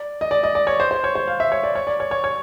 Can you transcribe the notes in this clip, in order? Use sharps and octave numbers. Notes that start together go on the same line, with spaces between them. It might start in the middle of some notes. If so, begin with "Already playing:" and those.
Already playing: D5
D#5
D5
D#5
D5
C#5
C5
C5
C#5
C5
F5
E5
C#5
D5
C#5
D5
C#5
C#5
C#5